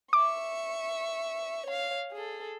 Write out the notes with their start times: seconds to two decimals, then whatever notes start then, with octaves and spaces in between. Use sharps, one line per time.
0.13 E5 C#6 D6
1.66 C#5 F5
2.12 G#4 A4